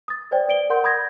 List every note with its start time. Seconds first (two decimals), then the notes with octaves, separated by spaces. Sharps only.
0.08 D#6 A6
0.31 B4 C5 D5 G5
0.49 D5 D7 G7
0.70 A#4 F#5 C6 G6
0.84 B5 D#6 G6 G#6 A#6